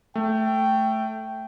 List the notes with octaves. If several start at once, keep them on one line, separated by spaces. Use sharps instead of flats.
A3 G5